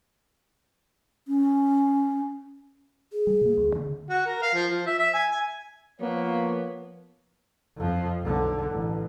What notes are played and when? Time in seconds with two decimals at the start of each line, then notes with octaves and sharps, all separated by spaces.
1.28 C#4
3.12 G#4
3.27 G3
3.41 B2 A#3
3.57 D2
3.76 D3
4.09 F#4
4.27 A#4
4.42 F5
4.54 F3
4.71 F3
4.87 E5
4.98 E5
5.14 G#5
5.31 G#5
6.00 F3 A#3 B3 C#5
7.76 F2 F3
8.22 B1 D3
8.72 A1